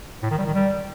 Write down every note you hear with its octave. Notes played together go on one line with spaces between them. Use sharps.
A2
D#3
G3
D#3
G3